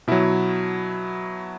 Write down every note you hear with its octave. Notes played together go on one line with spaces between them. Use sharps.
B2 F#3 E4